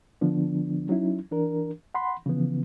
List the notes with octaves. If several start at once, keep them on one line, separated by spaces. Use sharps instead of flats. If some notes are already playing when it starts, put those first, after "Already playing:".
D3 F3 B3 D4
F#3 C#4 D#4 E4
E3 D4 A#4
F#5 B5 C6
C#3 E3 F3 B3